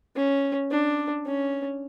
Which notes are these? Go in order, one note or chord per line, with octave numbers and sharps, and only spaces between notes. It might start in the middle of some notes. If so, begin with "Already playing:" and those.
C#4
D4
C#4